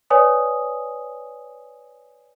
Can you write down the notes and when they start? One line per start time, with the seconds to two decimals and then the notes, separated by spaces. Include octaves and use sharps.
0.10 B4 C#5 D5 G#5 D#6